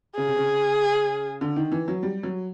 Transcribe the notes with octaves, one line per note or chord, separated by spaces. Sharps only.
C#3 G#4
C3
C#3
D3
D#3
E3
F#3
G3
F#3